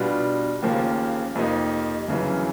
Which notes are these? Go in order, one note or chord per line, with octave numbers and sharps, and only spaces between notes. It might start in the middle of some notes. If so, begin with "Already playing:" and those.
Already playing: B2 G3 B3 D4 F4
D#2 C#3 F3 A#3
F2 C3 F3 A#3 D#4
G1 F#2 C#3 E3